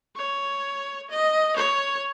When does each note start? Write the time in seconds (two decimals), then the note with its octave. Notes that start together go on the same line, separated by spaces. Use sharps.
0.16 C#5
1.11 D#5
1.57 C#5